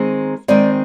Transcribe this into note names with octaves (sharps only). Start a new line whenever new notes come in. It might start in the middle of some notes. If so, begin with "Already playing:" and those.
Already playing: D#3 G#3 C4
D#3 G#3 C4 D5